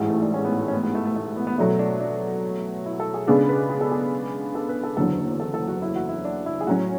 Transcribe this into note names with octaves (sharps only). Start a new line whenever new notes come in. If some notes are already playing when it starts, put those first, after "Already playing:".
Already playing: A1 G#2 E3 G#3
A3
D4
C#4
B3
A3
C#4
B3
B3
A3
A3
A3
B3
B3
B2 F#3 A3 D4
D4
D4
E4
A4
G#4
C#3 G#3 B3 D4 A4
B4
G#4
A4
G#4
A4
B4
A4
F#1 E2 D3 F#3 A4
A4
A4
F#4
E4
F#4
E4
D4
E4
G#4
A2 F#3 C#4 F#4